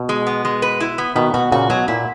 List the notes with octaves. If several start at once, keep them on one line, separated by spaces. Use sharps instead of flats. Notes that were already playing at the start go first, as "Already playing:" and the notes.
Already playing: B2
G#3
B3
G#3
B4
E4
B3
B2 D#3 B3
B2 F#4
A#2 C#3 F#4
B2 F#3
A#2 E4